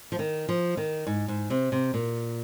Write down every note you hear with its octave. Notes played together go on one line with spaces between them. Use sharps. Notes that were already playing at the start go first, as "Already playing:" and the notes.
F3
D#3
F3
D#3
G#2
G#2
C3
C3
A#2